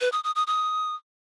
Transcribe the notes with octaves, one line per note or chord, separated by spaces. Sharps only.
B4
D#6
D#6
D#6
D#6